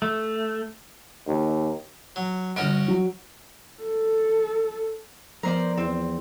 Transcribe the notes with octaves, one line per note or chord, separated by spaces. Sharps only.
A3
D#2
F#3
G1 C#4 F#4 D#5 F6 D7
F#3
A4
F3 B3 A#4 C5 D5
E2 C4